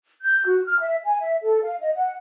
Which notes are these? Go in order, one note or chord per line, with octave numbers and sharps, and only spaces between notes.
G6
F#4
F6
E5
G#5
E5
A4
F5
D#5
F#5